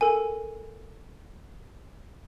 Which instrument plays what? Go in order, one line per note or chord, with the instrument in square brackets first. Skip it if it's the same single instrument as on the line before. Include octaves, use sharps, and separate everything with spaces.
[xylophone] A4 A#4 G#5